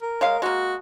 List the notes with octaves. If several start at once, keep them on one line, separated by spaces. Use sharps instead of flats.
A#4
G#3 C#5 F5
G#3 A#3 F#4